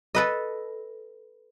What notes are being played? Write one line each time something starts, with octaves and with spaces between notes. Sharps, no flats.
A4 B4 D#5